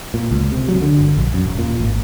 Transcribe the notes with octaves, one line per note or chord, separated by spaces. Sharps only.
A#2
C#2
C3
F#3
D3
G1
A#1
F#2
D#1
A#2
G#1